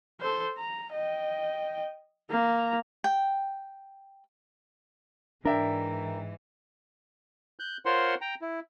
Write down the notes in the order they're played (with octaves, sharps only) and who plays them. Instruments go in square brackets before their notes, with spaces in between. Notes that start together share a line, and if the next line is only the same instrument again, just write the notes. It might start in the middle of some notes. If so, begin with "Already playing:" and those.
[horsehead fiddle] A4 C5
A#5
D#5 G5
A#3 A#5
[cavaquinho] G5
[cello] G#2 E3 [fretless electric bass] D4 [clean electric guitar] A#4 [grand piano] D5 E5 G5
[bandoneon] F#6 G6
F4 A#4 C5 C#5 F#5 C6
G5 A#5
E4